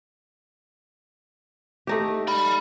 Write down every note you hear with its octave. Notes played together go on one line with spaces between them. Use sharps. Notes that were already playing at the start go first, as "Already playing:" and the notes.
A3 D#4 G4
D5 B5